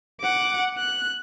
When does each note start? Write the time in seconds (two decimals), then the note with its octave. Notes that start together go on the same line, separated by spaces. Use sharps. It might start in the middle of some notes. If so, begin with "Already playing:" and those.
0.21 F#5 D6
0.78 F#6